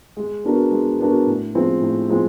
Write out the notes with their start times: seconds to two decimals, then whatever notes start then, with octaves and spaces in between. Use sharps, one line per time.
0.17 G#3
0.44 B3 D4 F#4 A#4
0.71 G#3
0.99 B3 D4 F#4 A#4
1.27 A2
1.55 F3 G#3 C4
1.82 A2
2.09 F3 G#3 C4